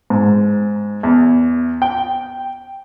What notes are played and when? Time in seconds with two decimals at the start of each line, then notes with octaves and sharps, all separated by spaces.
0.10 G#2
1.03 E2
1.82 G5